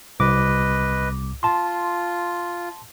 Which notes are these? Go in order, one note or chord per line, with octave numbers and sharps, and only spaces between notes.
C2 B4 D#5 D6
F4 A5 C6